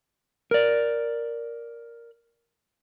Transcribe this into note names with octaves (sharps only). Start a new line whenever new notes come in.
A#4 D5